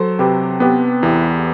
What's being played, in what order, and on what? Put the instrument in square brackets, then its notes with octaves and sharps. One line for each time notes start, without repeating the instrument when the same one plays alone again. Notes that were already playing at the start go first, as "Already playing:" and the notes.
Already playing: [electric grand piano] F#3 [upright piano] A4 C5
[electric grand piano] C3 [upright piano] G4 B4
[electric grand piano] B3 [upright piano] G4 B4
[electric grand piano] E2 [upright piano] E4 G4